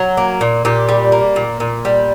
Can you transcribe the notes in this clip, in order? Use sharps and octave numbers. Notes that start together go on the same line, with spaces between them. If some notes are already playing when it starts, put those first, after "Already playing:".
Already playing: F#3
A#3
A#2
A#2 G4
G3
A#3
A#2
A#2
G3